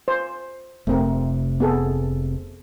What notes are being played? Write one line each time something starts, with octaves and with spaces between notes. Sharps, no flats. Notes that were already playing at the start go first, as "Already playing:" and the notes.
C5
F1 C3 A3 C4 A#4
B3 G#4 A4